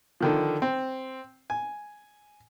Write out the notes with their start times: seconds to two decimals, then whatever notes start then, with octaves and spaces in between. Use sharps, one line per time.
0.21 D3 D#3 F3
0.62 C4
1.50 G#5